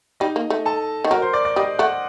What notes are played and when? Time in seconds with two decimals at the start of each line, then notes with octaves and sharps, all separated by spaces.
0.20 G3 D#4 D#5
0.36 A#3
0.50 A3
0.65 A4 A5
1.04 D#3
1.11 F#3 A#4 A#5
1.22 C5 C6
1.33 D5 D6
1.45 D5 D6
1.56 G3 D#5 D#6
1.79 A3 F#5 F#6